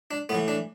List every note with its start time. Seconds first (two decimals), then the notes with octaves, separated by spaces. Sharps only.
0.11 D4
0.29 A2 B3
0.35 E3
0.48 D4